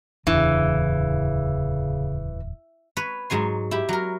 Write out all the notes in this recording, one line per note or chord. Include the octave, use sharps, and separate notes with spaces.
D1 E2 C#3 E3 D4
B4 C#5
G#2 F#3 G#5 C6
E4 G4
F#3 A#4